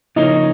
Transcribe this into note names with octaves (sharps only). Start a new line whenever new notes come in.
C#3 F3 A#3 C#4 D#4